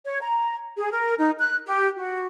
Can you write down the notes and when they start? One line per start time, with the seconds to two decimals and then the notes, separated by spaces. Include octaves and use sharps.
0.05 C#5
0.22 A#5
0.76 G#4
0.91 A#4
1.18 D#4
1.39 F#6
1.67 G4
1.97 F#4